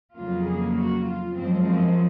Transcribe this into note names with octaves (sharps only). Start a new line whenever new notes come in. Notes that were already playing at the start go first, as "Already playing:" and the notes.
F2 C#3 F#3 A#3 F4
G#4
F#4
F4
F#2 F3 G#3 C4
C4